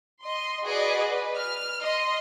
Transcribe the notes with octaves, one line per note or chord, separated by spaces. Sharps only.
D#5 C6
F#4 G#4 B4 D5 D#5
B4
F6
D#5 C6